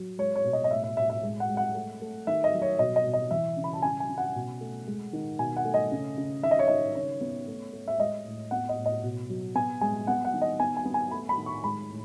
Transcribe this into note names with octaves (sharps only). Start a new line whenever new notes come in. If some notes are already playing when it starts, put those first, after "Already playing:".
Already playing: F#3
G#3 C#5
C#5
B2
D#5
D#5
A2 E5
E5
A2 E5
E5
G#3
F#5
G#3
F#5
A3
A3
D#3 E5
D#5
F#3
C#5
B2 D#5
D#5
B2
D#5
E3 E5
C#3
B5
A5
C#3 G#5
G#5
C#3
F#5
B2
A3
G#3
D#3
B2 G#5
F#5
A3
D#5
C#3
C#3
D#3 E5
D#5
C#5
D#3 D#5
C#3 C#5
B3
A3
A3
E5
G#3 D#5
A2
B3 F#5
D#5
A2
D#5
B2
F#3
B3 G#5
G#3 G#5
B3 F#5
F#5
D#3
D#5
B3 G#5
G#5
B3
G#5
A3 B5
B5
D#3
C#6
G#3 B5
A2